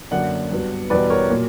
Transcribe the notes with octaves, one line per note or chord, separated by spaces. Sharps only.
F#2 D3 F#3 A#3 D5 F#5
G2 F#3 B3
E2 B2 G3 B3 B4 D5
A#4 C#5
A#2 F#3 A#3